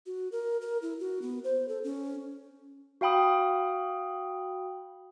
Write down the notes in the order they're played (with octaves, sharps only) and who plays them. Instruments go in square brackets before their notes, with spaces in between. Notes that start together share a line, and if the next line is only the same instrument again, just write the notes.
[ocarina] F#4
A#4
A#4
E4
F#4
B3
C5
A4
C#4
[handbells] F#4 F5 G5 B5 D#6